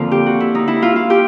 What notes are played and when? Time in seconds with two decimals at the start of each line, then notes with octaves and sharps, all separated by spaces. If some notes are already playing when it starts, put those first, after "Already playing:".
Already playing: F2 D3 F3 A#3 F4
0.11 G4
0.26 F#4
0.40 E4
0.55 D#4
0.68 E4
0.82 F4
0.96 F4
1.10 G4